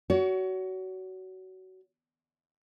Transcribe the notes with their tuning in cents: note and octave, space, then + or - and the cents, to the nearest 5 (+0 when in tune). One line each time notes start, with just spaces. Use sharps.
F#4 +20 C#5 +35